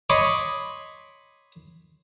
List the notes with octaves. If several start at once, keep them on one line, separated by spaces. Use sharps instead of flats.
C#5 D#5 B5 C6 D6